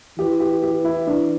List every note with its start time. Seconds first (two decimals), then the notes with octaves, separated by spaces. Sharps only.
0.19 E3 G4
0.40 G4
0.63 G4
0.84 E4
1.07 D4